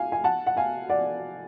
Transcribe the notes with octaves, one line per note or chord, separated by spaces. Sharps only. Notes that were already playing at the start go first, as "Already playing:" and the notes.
Already playing: F5 G#5
G#5
F#5 A5
F#5
F5 G#5
D5 F#5